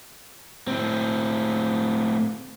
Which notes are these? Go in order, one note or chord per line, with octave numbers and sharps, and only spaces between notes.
A2 C4